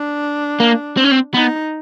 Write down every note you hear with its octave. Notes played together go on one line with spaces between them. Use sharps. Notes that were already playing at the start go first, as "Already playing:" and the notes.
Already playing: D4
A#3
C4
C#4
C4
B3 D#4